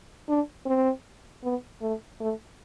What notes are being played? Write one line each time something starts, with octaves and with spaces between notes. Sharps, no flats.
D4
C4
B3
A3
A3